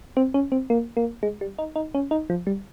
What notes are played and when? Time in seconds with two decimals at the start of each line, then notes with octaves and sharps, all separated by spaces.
0.17 C4
0.34 C#4
0.52 C4
0.70 A#3
0.97 A#3
1.23 G#3
1.41 G3
1.58 D#4
1.76 D#4
1.95 C#4
2.11 D#4
2.30 F3
2.47 G3